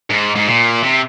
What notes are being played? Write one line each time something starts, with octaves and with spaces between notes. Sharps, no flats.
G#2
G#2
A#2
C3